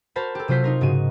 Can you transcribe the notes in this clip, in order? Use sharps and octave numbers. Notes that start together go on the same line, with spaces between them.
F#4 A#4 C5 A5 B5
G4 A4
C3 F#3 F4 C5 B6
D#4 F4 A#4
G#2 C#3 F#4 D#7